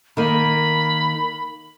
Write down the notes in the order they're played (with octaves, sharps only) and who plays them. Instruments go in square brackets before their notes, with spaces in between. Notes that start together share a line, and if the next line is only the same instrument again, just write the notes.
[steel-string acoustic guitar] D#3 A#3 [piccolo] B5